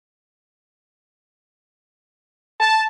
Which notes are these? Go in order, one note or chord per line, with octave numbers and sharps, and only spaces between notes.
A5